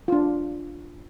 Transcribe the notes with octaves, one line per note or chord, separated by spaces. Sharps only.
D4 F4